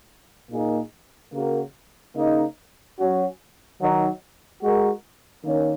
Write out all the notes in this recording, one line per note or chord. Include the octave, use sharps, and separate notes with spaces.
A#2 A#3 D#4 G#4
C#3 A#3 F#4 A#4
C#3 A#3 D#4
F#3 C#4 F#4
D#3 F#3 D#4
G#3 F#4 A#4
D#3 A#3 C#4